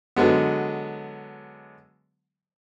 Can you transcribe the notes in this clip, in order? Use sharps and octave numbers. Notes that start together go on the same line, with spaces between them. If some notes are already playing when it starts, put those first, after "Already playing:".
D3 F#3 G#3 B3